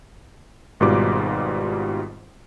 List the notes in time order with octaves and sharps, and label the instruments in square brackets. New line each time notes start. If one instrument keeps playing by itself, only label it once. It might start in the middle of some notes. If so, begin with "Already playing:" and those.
[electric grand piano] G#1 G#2 B2 G3 F4 D6